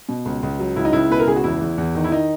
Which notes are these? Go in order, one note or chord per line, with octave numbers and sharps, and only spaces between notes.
B2
C#2
C#2
F#3
C#2 E4
D#4
C#2 E4
B2 B4
A#4
C#2 G#4
F#4
E2 E4
E2
E2
D#3
E4
D#3 D#4